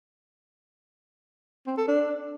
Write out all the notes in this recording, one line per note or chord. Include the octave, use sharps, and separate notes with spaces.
C4
A4
D4